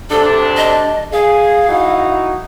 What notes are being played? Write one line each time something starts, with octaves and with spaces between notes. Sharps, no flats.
D2 C3 D4 A4
D#5
G#4 F5
D#4 E4 F#4